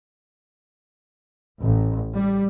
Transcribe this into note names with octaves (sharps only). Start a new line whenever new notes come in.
A1
G3